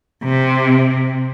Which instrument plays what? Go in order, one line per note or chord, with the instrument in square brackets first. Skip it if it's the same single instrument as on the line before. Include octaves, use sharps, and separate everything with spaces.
[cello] C3